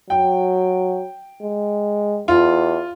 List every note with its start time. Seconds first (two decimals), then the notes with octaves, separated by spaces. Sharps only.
0.10 F#3 G5
1.42 G#3
2.28 E2 F4